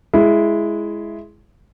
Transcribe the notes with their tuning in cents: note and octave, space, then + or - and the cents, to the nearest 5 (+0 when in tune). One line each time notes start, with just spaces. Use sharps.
G#3 +10 E4 +10